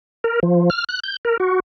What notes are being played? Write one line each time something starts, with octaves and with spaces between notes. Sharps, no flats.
A#4
F3
F6
F#6
G6
A#4
F#4